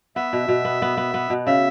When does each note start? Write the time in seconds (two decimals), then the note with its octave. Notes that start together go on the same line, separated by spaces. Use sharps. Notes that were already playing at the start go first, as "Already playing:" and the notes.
0.16 B3 E5
0.33 B2
0.48 B2
0.65 B3
0.82 B3
0.97 B3
1.14 B3
1.30 B2
1.47 C#3 E5